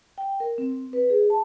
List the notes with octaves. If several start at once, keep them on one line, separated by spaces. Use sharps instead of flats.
G5
A#4
C4
B4
G#4
A5